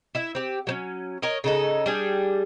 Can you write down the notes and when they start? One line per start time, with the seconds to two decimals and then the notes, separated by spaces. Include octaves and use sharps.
0.15 E4 E5
0.35 C4 G4
0.67 F#3 C4 C#4
1.22 A#4 C#5 D#5
1.44 C#3 D#4 A4
1.86 G3 D4 G#4